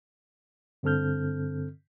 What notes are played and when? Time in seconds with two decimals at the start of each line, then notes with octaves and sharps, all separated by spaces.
0.83 G2 D3 C4 A4 F6 G6